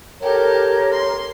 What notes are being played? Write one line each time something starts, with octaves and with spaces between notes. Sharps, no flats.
G4 A4 A#4 C#5 A#5
C6